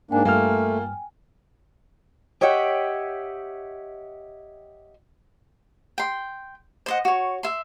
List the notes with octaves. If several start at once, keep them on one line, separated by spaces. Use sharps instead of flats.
G#2 A#3 D4 G5 G#5
G2 A3 A#3 F4 F6
G4 C#5 D#5 E5 F#5 G5
G5 C6
C5 D#5 F#5
F#4 C#5
E5 C6